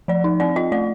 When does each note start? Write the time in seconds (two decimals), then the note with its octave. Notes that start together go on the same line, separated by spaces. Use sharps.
0.08 F3 D5
0.24 D#4
0.40 C4 D5
0.56 F4 D#5
0.72 A3 D5